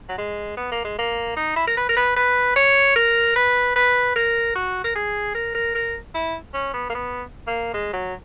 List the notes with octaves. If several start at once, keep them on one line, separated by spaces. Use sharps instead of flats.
F#3
G#3
B3
A#3
G#3
A#3
D#4
E4
A#4
B4
A#4
B4
B4
C#5
A#4
B4
B4
A#4
F#4
A#4
G#4
A#4
A#4
A#4
E4
C#4
B3
A#3
B3
A#3
G#3
F#3